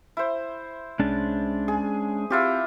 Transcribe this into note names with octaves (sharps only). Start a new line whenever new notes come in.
E4 C5
C2 G#3 C#4 D4 A6
G#4
C4 E4 F4 G4